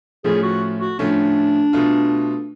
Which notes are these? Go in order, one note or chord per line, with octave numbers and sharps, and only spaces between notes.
A2 F3 A3 C#4 G#4
F#4
F#4
A2 F3 A3 C#4 D4
B2 A3 F4